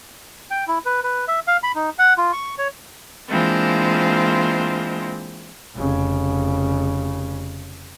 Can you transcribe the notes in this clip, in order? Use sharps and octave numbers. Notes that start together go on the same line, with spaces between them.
G5
E4
B4
B4
E5
F5
B5
D#4
F#5
F4
C#6
C#5
E3 G#3 A#3 C4 D4 F4
F1 C#3